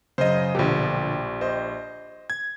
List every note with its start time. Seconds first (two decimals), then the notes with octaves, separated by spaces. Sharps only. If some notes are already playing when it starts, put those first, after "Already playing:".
0.18 F#2 C#3 C5 D#5
0.55 A#1 B2 D3 F3 G4
1.41 C5 D#5
2.30 G#6